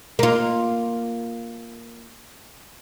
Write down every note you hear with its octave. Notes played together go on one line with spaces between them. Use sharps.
A#3 F4